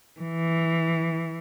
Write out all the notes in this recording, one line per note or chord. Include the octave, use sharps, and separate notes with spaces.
E3